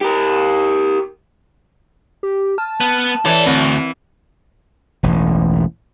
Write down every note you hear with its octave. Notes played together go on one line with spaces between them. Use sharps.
G4 A#4
G4
A5 F6
B3
E3 A4 C#5 D5
D2 C4
E1 A1